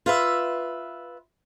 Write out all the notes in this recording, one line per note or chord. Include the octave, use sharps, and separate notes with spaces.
F4 B4 E5